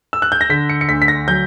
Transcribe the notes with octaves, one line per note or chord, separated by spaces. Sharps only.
E6
F#6
G6
A#6
D3 B6
C#7
C#7
D2 B6
B6
A#6
F#3 G6